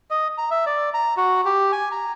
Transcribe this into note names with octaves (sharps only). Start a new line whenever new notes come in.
D#5
A#5
E5
D5
A#5
F#4
G4
G#5
A#5